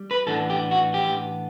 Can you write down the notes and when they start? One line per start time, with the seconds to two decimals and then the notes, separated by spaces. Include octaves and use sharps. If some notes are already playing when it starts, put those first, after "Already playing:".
Already playing: G3
0.11 B4
0.27 A2 E3 B3 D4 A4
0.50 G4
0.71 F#4
0.94 G4